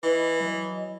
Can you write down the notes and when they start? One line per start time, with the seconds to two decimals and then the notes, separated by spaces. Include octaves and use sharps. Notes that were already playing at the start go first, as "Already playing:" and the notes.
0.03 E3 B4 D#5
0.41 F#3 D#5